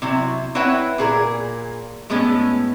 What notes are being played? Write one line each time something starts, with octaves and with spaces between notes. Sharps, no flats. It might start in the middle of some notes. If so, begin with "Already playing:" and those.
C3 F#3 E4
C4 E4 B4 C#5 E5 F#5
A#2 G#4 A#4
A2 G#3 A3 B3 C#4